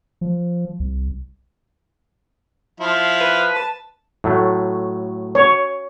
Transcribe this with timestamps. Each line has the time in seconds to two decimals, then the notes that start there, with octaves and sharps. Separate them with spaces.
0.21 F3
0.80 C2
2.80 F3 E4 F5
3.21 B4
3.53 A5
4.24 A2 F#3 A3
5.35 C#5